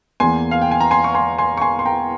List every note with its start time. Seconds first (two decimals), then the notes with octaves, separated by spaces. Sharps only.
0.20 E2 E3 A#3 G#5 C6
0.51 F5
0.62 G5
0.71 G#5
0.81 A#5
0.91 G#5 C6
1.04 C#6
1.14 G#5 C6
1.38 G#5 C6
1.57 C#6
1.62 G#5 C6
1.79 C6
1.85 G5 A#5